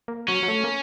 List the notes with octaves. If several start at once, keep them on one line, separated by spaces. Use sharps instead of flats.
A#3
F#3 C#4
F#3
A3
A#3